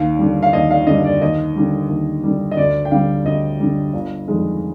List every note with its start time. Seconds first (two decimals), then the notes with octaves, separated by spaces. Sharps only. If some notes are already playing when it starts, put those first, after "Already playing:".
Already playing: D#2 F5
0.19 D3 G3
0.43 F5
0.53 D#2 D#5
0.71 F5
0.87 D3 G3 D#5
1.04 D5
1.22 D#2 D#5
1.56 D3 G3
1.89 D#2
2.23 D3 G3
2.51 D#5
2.57 D2 D5
2.85 G5
2.91 D3 G3 F5
3.25 D2 D#5
3.60 D3 G3
3.93 G1
4.28 F2 D#3 G#3